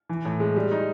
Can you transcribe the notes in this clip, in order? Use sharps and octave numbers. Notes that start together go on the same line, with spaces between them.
E3
A2
G#3
G3
D#4